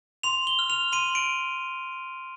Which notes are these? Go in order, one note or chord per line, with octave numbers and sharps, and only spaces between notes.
C6 F7
G7
F6
F7
C6 D#7
D7